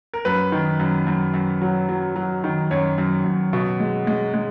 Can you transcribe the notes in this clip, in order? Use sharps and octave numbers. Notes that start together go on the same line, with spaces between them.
A#4
F#2 B4
D#3
F#2
F#2
F#2
F#3
F#3
F#3
D#3
F#2 C#5
F#2
F#2
B2
G#3
G#3
G#3